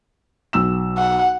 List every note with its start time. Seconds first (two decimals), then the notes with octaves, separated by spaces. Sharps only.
0.53 B1 E6 E7
0.98 F#5